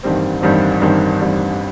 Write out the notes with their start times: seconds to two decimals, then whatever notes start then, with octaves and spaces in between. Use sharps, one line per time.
0.03 A1 G2 D#3 G3 C4
0.42 A1 G2 D#3 G3 C4
0.81 A1 G2 D#3 G3 C4
1.20 A1 G2 D#3 G3 C4